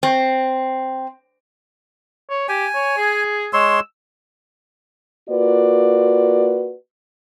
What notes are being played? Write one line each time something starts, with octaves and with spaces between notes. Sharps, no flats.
C4
C#5
G4 G#5
C#5
G#4
G#3 C#5 C6 E6
A#3 F4 F#4 B4 D5